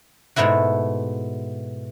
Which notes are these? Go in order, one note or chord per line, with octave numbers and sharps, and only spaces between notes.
G#2 B2 A3 E4 F#4